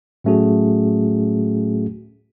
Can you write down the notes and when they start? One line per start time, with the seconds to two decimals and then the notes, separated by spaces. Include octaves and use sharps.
0.24 A2 F#3 A3 C#4 F#4 G#4